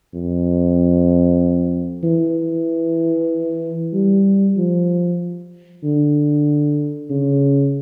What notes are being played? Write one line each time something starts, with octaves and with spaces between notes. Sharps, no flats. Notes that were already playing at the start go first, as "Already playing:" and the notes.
F2
E3
G3
F3
D3
C#3